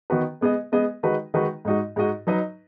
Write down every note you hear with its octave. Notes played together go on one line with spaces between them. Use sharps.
D#3 B3 F#4 B4
G#3 B3 G#4 D#5
G#3 B3 G#4 D#5
D#3 G#3 D#4 F#4 B4
D#3 G#3 D#4 F#4 B4
G#2 G#3 D#4 F#4 D#5
G#2 G#3 D#4 F#4 D#5
F#3 D#4 B4 D#5